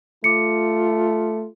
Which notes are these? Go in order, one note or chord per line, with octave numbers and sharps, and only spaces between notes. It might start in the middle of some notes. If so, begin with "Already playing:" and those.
A3 F4 D6 C#7